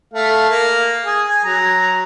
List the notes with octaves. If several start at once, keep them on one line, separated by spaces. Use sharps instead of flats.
A3 F5
A#3
G#4
G#5
F#3 A#5